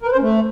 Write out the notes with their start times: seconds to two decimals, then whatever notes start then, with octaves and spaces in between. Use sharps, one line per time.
0.02 A#4
0.07 B4
0.12 C5
0.17 C#4
0.22 A3